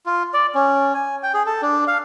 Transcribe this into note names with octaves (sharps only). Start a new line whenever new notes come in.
F4
D5
C#4
G#5
G5
G#4
A4
D4
F5